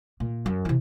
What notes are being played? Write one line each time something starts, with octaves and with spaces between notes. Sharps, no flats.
A#2
F#2
C3 E3